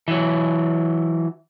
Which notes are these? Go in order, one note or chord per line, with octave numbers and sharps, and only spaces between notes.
E3 F#3